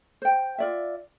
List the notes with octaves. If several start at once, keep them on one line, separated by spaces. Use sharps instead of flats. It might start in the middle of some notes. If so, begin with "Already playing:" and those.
C5 G5
F4 D5 E5